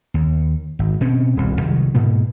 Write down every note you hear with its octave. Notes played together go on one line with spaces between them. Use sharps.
D#2
G#1
B2 C4 C#4
D#1 C2
C2 D#3 F#3
G#2 B2 A#3